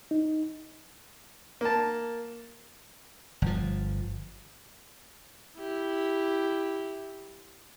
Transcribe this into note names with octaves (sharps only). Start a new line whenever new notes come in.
D#4
A#3 A5
G1 F3
E4 G4